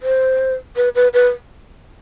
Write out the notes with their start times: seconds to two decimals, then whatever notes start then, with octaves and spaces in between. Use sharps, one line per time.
0.02 C5
0.76 B4
0.95 B4
1.14 B4